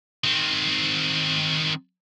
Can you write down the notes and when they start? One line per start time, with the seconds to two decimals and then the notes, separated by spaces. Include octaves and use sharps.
0.24 D#3 C4